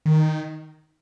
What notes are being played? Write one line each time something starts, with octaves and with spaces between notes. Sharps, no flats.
D#3